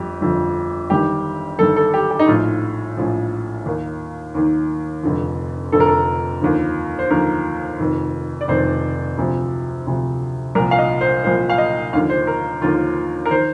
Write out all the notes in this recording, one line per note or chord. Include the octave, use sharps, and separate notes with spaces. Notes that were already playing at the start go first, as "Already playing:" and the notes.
Already playing: G1 F2 F3 G4
G1 F2 D3 F3
G1 G2 D#3 G4
G1 G2 D#3 A4
A4
G4
G4
D#4
A#1 A2 F3 F4
A#1 A2 F3
D#2 D#3
D#2 D#3
F1 F2 D3 F3
F1 F2 D3 F3 A4
A#4
A4
D#2 D3 F3
C5
D#2 D3 F3 A#4
F1 F2 D#3
D5
F1 F2 D#3 C5
D2 C3 F3
D2 C3 F3
C2 A#2 F3 A#4
F5
D#5
C5
C2 A#2 F3 C5
F5
D#5
D#2 D3 F3 F5
C5
A#4
D#2 D3 F3 F4
A#4
D#3 C5